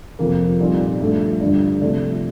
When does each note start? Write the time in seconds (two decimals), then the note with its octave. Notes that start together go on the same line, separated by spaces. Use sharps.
0.19 F2 C3 F3 A#3
0.60 A#2 G3 C4 D#4
1.00 G2 F3 A3
1.41 G2 D3 G3 D4
1.82 C3 F3 A3 D4